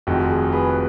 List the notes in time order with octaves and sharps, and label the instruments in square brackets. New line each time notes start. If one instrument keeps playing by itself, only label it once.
[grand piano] F1 F2 D#3 G#3 F#4
G#4
G#4 B4